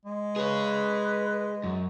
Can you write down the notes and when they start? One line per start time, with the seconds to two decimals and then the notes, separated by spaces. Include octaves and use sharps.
0.05 G#3
0.36 G#4 B4 C#5
1.64 F#2